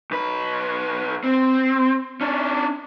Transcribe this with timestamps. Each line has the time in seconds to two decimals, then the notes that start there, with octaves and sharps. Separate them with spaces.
0.11 B1 B4
1.24 C4
2.21 C#4 D4